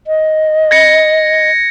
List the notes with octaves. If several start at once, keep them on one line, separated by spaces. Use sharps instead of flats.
D#5
G#6 A#6 C#7